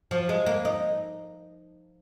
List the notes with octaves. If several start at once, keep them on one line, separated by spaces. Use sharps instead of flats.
F3
G#3
A#3
D#4